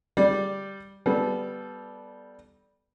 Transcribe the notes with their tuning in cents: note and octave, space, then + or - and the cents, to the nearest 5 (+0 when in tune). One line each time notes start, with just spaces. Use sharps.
G3 +0 D5 +0
G3 +0 B3 +0 A4 -20